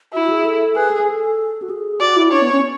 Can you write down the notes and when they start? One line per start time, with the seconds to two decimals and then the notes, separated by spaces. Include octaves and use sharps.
0.13 E4 F#4
0.30 G#4
0.45 A4
0.76 G#4 B4
0.91 A4
1.01 G#4
1.10 A4
1.62 F#4
1.70 G#4
2.00 F#4 D5
2.17 E4
2.32 D4 C#5
2.42 B3
2.52 C#4